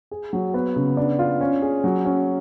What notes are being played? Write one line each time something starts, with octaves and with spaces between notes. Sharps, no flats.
G#4
F#3
B3
C#3
D4
F4
C#4
G#4
F#3
C#4